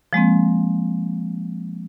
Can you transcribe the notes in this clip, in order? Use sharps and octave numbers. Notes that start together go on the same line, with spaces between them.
F3 G#3 A#3 C4